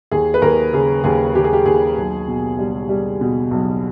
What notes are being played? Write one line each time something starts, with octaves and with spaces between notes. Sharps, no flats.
D#2 G#4
B4
D#2 A#4
C#3 G#4
D#2 G#4
D#2 G4
G#4
G4
D#2 G#4
B1
B2
G3
G3
B2
B1